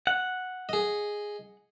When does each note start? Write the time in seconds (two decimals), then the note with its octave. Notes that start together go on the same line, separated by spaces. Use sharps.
0.07 F#5
0.69 G#4 D#5